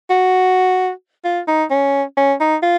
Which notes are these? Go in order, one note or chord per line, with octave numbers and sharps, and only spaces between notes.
F#4
F4
D#4
C#4
C#4
D#4
F4